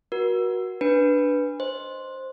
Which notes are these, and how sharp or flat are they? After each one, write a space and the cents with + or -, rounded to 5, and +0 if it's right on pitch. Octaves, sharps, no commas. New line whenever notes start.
F#4 +0 A#4 +40
D4 +0 B4 +0
C5 +5 D#5 -10